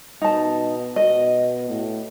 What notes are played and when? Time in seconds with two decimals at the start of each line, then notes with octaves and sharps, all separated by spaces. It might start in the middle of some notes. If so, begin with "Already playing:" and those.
0.21 B2 D#4 A5
0.96 B2 D#5
1.69 A2